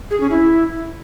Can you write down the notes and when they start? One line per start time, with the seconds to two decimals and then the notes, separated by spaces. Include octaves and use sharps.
0.10 G#4
0.20 C#4
0.30 E4